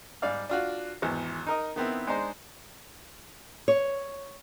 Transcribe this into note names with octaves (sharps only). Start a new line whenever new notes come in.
G#2 G3 D5 F5
D4 F4 F#4
G#1 E2
D#4 A#4 D#5
D#3 B3 C4 E4
G#3 D4 D#4 C5
C#5